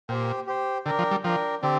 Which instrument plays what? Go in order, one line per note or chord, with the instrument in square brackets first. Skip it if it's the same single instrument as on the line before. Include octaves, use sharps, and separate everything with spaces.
[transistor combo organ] A#2 [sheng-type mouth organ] G4 C5 G5
[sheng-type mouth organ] G4 C5 G5
[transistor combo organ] D3 [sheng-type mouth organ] D4 A#4 G5
[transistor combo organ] F3
G3
[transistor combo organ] F3 [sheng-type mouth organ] D4 A#4 G5
[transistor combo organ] D3 [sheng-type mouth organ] C4 G4